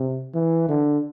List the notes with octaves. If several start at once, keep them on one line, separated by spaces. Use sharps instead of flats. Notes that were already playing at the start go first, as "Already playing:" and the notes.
Already playing: C3
E3
D3